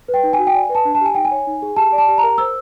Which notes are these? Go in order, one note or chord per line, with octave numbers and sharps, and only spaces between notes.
B4
G5
D#4
G#5
F#4
G5
D5 G#5
B4
A5
D4
A5
G4 G#5
D#4 G5
G#5
C#5
D#4
G#4
G4 A5
D5
A5
G4
A#5
A#4
C5 E6